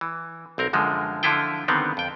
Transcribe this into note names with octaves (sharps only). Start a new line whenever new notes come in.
E3
B1 C4 A#4
F#2 D3 F3 G#3
D3 F3 E4 F4 G5
D3 D#3 G3 B3 C4
F2 G5